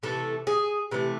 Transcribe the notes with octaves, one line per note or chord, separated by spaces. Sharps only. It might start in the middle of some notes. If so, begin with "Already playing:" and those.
C3 E3 A3 A4
G#4
C3 E3 A3